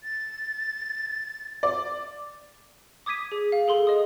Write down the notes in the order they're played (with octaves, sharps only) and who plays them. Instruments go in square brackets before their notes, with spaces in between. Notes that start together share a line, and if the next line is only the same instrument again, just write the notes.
[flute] A6
[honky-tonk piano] D5
[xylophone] D6 D#6 G#6 B6 D#7
G#4
F5
G#4 A4 C6
D#5 D#6